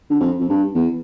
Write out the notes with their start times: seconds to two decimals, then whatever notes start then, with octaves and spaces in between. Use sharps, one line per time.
0.10 D3
0.21 F2
0.40 F2
0.49 G2
0.75 E2